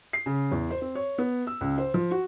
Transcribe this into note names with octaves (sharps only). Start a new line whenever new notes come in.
C7
C#3
E2
C5
C4
C#5
B3
E6
C#2
C5
F3
F#4